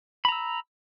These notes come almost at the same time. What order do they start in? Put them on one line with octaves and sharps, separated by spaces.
B5 A#5 E6